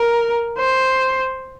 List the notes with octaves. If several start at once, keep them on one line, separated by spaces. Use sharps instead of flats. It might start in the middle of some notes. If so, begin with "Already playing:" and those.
Already playing: A#4
C5